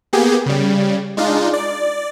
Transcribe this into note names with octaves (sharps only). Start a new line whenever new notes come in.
A#3 B3 G4 G#4
C#3 G3
G#3 D4 D#4 F4
D5